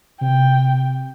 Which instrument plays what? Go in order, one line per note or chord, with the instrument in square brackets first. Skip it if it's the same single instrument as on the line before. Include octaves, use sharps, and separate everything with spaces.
[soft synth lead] C3 [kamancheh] G5